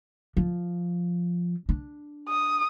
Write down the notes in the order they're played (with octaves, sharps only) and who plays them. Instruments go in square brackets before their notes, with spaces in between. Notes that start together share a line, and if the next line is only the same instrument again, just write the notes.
[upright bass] F3
D4
[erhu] D#6